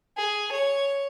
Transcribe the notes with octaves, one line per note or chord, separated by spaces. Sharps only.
G#4
C#5